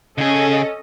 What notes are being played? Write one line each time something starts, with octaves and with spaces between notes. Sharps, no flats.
C#3 C#4 G#4 A4 D#5